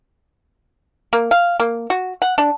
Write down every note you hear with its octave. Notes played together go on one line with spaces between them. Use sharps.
A#3
F5
A#3
F#4
F#5
D4